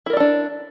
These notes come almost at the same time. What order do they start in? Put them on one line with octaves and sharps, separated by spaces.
E4 A#4 D5 A4 D4